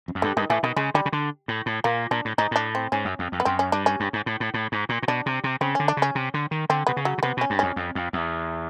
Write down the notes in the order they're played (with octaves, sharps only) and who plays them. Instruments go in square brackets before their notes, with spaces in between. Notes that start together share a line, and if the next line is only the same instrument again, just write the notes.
[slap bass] F2
F#2
[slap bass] G2 [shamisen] D3
[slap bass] G2 [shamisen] D#3
[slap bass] A2 [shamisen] E3
[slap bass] B2 [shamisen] D#3
[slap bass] C#3 [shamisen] G#3
[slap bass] D3 [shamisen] G3
[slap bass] C#3
D3
A2
A2
[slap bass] A#2 [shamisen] A#3
[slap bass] A#2 [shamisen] D4
[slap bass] A2
[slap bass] G#2 [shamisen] D#4
[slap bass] A2 [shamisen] D4
[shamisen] C4
[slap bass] G#2 [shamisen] C#4
[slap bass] F#2
F2
F2
[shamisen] B3
[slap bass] F#2 [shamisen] C4
[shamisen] C#4
[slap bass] G2 [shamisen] D4
[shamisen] C#4
[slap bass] G2
G#2
A2
A2
A2
G#2
A#2
A#2
[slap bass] B2 [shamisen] D4
[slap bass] C3
C3
[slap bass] C#3 [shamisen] C4
[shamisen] C#4
[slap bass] D3
[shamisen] D4
[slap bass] C#3
[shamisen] C#4
[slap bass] C3
D3
D#3
[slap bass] D3 [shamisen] C4
[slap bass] C3 [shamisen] B3
[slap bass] C#3
[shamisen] F#3
[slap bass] C#3
[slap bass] C3 [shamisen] B3
[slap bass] B2 [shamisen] C#4
[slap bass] G2
[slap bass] F2 [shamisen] C#4
[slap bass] F2
F2
E2